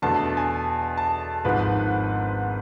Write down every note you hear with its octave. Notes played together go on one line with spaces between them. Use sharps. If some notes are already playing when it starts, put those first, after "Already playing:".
E2 B2 A3 D4 A5
G#5
A5
G#1 G#2 F3 B4